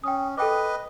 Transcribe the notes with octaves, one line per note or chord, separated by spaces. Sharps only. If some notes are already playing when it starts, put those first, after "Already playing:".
C#4 G5 D#6
A4 B4 D#5 G5 D6